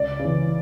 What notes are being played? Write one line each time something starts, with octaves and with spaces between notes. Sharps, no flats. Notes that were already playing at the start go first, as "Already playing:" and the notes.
Already playing: C#2 D5
C#3
E3